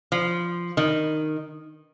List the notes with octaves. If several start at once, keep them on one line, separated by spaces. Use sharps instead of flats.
F3
D#3